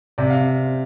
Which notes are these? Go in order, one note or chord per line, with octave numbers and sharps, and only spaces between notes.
C3 D5
F5